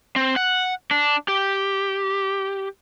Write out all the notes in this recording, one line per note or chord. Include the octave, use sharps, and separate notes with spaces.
C4
F#5
D4
G4